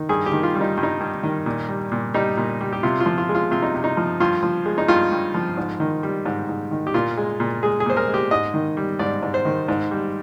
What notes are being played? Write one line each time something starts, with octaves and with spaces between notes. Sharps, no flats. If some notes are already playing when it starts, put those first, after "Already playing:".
Already playing: D#3
G2 G#4
G4
D#3
F4
G3
D#4
G2
D#4
G2
D#3
A#2
G3
A#2
G3 D#4
A#2
G3
G4
C3 F4
F4
F3
F4
G#3
F4
C3 F4
D#4
C3
D#4
F3
G2 F4
F3
G#3
D#4
G2 F4
G2
F3
G#2
D#3
G3
G#2
G#2
D#3
G4
A#2 F4
G#3
A#2
G#3 G#4
G#4
A#2 C5
A#4
G#3
G4
G#2 D#5
D#3
G3
G#2 D5
G#2
C5
D#3
G#2
G3